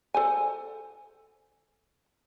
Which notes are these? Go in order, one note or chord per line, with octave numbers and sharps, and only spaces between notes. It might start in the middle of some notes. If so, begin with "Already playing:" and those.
A4 C5 G#5